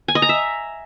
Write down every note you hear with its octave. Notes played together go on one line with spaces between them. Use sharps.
G#5
D#5
A#5
E5